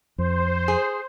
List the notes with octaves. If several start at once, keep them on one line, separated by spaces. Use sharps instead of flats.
F2 C5
G#4